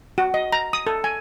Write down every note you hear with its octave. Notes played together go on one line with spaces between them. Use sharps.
F#4
D#5
A#5
D#6
A4
G#5